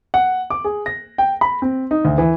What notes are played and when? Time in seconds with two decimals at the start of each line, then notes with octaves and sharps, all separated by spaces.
0.14 F#5
0.50 D6
0.64 G#4
0.86 A#6
1.18 G5
1.41 B5
1.62 C4
1.91 D#4
2.05 D2
2.18 E3